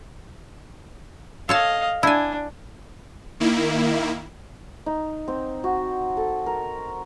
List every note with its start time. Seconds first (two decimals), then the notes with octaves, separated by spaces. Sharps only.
1.49 A4 C#5 D#5 F5 A5
2.03 D4 E4 G#5
3.40 D#3 A#3 E4
4.86 D#4
5.28 C4
5.64 F#4
6.17 A4
6.46 A#4